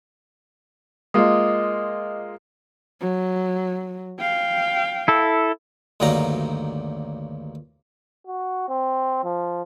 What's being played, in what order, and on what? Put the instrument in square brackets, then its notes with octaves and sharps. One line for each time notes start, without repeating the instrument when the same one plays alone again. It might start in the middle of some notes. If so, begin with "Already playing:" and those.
[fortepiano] G#3 A#3 F4 [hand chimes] D#5 D6 D#6
[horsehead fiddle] F#3
F5 G5
[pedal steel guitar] E4 A4
[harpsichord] D2 G2 D#3 F#3 A#3 A#5
[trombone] F#4
C4
F3